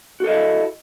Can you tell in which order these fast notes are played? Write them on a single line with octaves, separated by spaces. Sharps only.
F#4 A4 D#5 E4